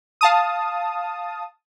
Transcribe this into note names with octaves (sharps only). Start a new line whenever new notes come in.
F5 A5 D#6